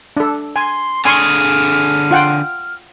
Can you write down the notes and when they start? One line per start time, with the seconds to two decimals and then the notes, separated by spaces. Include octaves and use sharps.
0.17 D4 A4
0.56 G#5 C6
1.05 D3 G#4 G#5 C6 C#6 F6
2.11 F4 F#5 G5